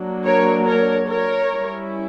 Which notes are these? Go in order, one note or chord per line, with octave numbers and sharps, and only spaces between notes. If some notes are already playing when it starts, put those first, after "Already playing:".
Already playing: F#3 A#3 D4
A#4 C#5
A#4 C#5
A#4 C#5
G3 C#4 E4